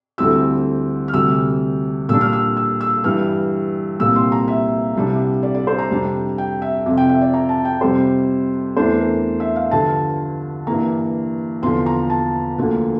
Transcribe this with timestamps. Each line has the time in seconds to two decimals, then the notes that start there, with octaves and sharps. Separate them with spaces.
0.18 D2 D3 G3 C4 E4 E6
1.08 F6
1.14 D2 C3 G3 E6
2.09 A#2 G3 D4 E6
2.21 F6
2.33 E6
2.57 E6
2.81 E6
3.04 G2 E3 G3 F6
4.00 C2 A#2 G3 C4 E6
4.16 C6
4.32 A#5
4.48 E5
4.95 C2 C3 G3 D4
5.43 D5
5.55 D5
5.67 C5
5.78 A#5
5.90 F2 C3 G3 D4
6.38 G5
6.62 E5
6.86 F2 C3 F3
6.97 G5
7.09 E5
7.21 D5
7.34 A#5
7.49 A5
7.65 G5
7.81 F2 C3 G3 C5
8.77 E2 E3 A3 D4 C5
9.00 A#4
9.40 E5
9.56 F5
9.71 G2 D3 F3 A5
10.67 G2 E3 A#3 A#5
11.62 E2 D3 F3 C6
11.86 A#5
12.10 A5
12.58 D2 D3 F3 A#3